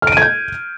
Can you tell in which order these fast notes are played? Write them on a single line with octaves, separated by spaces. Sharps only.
F6 D7 D#7 G#6 G6